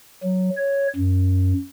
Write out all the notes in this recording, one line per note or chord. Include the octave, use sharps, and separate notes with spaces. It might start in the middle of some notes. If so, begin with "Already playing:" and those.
F#3
C#5
F#2